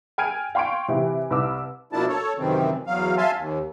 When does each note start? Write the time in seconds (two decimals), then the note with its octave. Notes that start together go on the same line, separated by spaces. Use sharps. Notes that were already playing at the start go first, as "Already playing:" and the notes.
0.18 G5 G#5 F6 G#6 D7 D#7
0.55 F5 G5 C6 C#6 G#6 D7
0.88 C3 E3 G4
1.30 C2 B4 D6 E6
1.93 B2 F3 A#3 D4 E4 A5
2.08 A4 C#5
2.38 F#2 C3 D#3 E3 C4
2.87 E2 F#3 F5
3.17 E5 F5 G#5 A5 C6
3.37 D#2